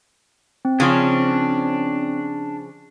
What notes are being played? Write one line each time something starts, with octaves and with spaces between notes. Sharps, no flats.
C4
C#3 F3 C#4 D4